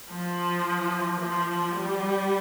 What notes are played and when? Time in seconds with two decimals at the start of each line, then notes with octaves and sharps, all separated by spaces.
0.11 F3
1.20 F3
1.76 G3